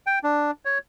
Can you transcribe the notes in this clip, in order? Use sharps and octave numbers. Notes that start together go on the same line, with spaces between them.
G5
D4
C#5